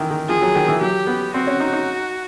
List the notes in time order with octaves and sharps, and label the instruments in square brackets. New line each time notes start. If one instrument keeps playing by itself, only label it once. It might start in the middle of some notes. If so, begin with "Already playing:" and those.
Already playing: [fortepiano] D#3 E3
D#3
[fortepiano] F3 [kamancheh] G#4
[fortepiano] F#3
D#3
E3
[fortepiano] F#3 [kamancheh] G4
[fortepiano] B3
[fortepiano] C4 [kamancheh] F#4
[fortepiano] C#4
D#4
D#4